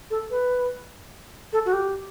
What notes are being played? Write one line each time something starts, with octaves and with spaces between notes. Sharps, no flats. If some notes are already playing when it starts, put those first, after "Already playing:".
A4
B4
A4
F#4
G4